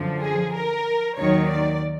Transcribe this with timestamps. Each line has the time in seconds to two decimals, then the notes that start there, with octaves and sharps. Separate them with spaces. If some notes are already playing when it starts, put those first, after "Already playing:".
Already playing: F#2 D3 F3
0.22 G#4
0.54 A#4
1.18 D#2 D#3 F#3 C#5
1.49 D5